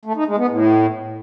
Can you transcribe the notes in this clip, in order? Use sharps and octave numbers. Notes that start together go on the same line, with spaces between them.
A3
D#4
G#3
B3
A2